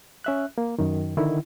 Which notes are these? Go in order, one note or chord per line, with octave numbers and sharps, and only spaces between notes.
C#4 E5 F#6
A#3
F#2 D#3
D3 D#3 E4